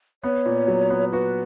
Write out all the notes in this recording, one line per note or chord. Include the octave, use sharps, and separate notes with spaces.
B3 C#5
A#2
F#3
B3
F#4 B4